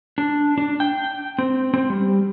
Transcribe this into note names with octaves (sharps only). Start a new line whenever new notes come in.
D4
D4
G5
C4
C4
G3